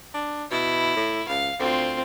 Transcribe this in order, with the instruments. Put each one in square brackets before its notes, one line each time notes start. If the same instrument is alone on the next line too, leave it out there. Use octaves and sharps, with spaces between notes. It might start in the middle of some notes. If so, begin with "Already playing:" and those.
[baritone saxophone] D4
[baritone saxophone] B2 [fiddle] E4
[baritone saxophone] A2
[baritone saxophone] C#2 [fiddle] F5
[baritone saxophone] D2 [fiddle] C4 F4